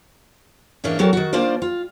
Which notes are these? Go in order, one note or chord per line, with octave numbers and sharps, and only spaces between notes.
G#2 E3 A#3 C#4 D4
F#3 C4 F#4 A4 A#4
D#3 F#4
D#3 A#3 D4 F4 C5 D5
F4